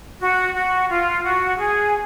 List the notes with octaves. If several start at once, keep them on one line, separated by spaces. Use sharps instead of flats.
F#4
F#4
F4
F#4
G#4